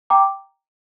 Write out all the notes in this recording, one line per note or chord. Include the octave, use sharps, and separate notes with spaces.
G5 A#5 D6